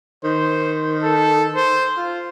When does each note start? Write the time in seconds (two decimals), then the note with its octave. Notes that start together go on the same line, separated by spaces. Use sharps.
0.24 D#3 C5
1.03 A4
1.56 C5
1.97 F4